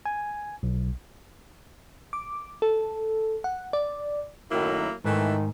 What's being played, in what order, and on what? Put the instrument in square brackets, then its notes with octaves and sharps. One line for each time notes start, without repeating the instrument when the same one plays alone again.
[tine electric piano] G#5
B1
[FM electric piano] D6
A4
F#5
D5
[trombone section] F#2 A2 D#3 [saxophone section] F#3 A#3 E4
[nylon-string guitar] G#2 [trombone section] D#3 [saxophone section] E3 A3